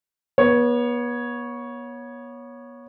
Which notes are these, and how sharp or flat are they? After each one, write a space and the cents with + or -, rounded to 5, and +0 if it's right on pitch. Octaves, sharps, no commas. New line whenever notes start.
B3 -35 C#5 +0